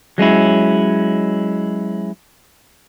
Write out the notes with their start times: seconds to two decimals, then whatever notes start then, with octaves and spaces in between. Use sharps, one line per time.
0.18 F#3 G#3 C#4 E4